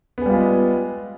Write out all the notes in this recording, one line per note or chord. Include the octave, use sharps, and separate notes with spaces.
G3 G#3 B3 F4 G#4